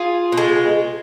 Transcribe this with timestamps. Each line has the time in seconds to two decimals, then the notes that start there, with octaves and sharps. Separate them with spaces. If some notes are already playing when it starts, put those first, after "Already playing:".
Already playing: F4 G#4
0.32 B2
0.37 G#3